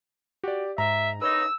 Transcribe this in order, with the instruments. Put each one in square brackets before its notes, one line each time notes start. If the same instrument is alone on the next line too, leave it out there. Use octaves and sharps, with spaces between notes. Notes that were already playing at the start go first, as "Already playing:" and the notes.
[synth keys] F#4 [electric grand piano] G4 D5
[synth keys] G#2 [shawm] E5 [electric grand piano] A#5
[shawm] D#4 [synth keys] B4 C#5 D#5 [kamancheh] E6